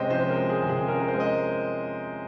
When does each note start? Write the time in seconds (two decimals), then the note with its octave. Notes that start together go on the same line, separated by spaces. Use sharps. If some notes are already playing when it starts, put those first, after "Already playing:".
Already playing: C3 G#3 C#4 C5 D#5 G5
0.10 F3 C5
0.30 A#4
0.36 G#3
0.49 G#4
0.63 C3
0.69 G#4
0.88 C#4 A#4
1.00 A#4
1.08 C5
1.14 G#3
1.20 D#5